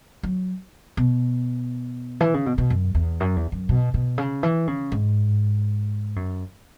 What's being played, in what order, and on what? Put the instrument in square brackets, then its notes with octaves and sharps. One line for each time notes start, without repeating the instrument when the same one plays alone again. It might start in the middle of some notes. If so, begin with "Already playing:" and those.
[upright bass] F#3
B2
E3
C#3
B2
B2
F#2
E2
F#2
E2
F#2
B2
B2
C#3
E3
C#3
G#2
F#2